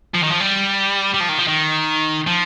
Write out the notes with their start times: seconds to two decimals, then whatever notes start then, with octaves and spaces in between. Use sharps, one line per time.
0.14 F3
0.23 D#3
0.31 F3
0.40 G3
1.14 G3
1.21 F3
1.29 D#3
1.38 F3
1.48 D#3
2.27 F3